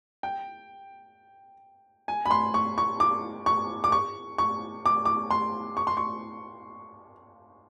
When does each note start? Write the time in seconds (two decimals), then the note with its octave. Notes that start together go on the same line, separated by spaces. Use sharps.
0.23 G5
2.08 G#5
2.26 B5
2.31 C6
2.54 C#6
2.78 C#6
3.00 D6
3.46 C#6
3.84 D6
3.92 C#6
4.38 C#6
4.86 D6
5.05 D6
5.31 C6
5.77 C#6
5.87 C6
5.97 C#6